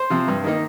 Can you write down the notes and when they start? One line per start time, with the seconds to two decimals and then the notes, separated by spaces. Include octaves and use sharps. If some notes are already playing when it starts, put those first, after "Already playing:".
Already playing: C5
0.10 C3 F3
0.28 G2
0.44 D#3 A#3 D#4